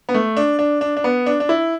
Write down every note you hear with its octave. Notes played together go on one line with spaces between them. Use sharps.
B3
A3
D4
D4
D4
D4
B3
D4
D4
E4